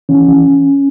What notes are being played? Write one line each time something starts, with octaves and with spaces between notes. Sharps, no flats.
E3 C#4
E3